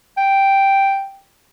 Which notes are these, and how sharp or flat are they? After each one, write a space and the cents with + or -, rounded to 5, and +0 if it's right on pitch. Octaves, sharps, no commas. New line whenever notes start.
G5 +0